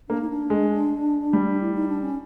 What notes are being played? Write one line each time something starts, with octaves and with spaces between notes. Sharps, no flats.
A#3 D4
D#4
D4
G#3
G3
E4
D#4
D4
C#4